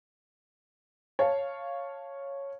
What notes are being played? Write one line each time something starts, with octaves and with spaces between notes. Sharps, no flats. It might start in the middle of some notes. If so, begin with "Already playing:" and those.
C#5 F5 A5